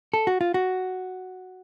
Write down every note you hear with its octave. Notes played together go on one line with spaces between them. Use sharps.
A4
F#4
F4
F#4